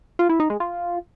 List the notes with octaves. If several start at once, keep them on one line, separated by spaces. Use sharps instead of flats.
F4
E4
D#4
G#3
F4